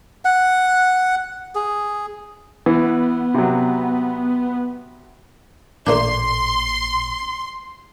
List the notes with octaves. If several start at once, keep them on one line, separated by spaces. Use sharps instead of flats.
F#5
G#4
E3 B3
C3 F#3
A1 A#2 A3 A#3 D4 C6